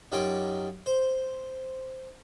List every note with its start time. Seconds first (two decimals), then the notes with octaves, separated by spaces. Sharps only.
0.12 F#2 G3 D#4 F4 C#5 D6
0.86 C5